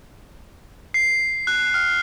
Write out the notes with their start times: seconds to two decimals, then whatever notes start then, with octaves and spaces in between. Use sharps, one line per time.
0.94 C7
1.47 F#6
1.74 F6